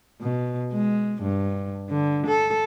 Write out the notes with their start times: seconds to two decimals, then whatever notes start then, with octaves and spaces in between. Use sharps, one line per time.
0.21 B2
0.73 G#3
1.22 G2
1.90 D3
2.27 A4